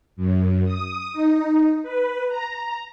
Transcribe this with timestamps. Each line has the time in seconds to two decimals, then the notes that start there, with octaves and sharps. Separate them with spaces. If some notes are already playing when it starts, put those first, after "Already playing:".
0.17 F#2
0.65 D#6
1.13 D#4
1.83 B4
2.28 A#5